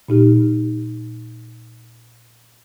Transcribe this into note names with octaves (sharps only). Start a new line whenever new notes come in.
A#2 D#4 G4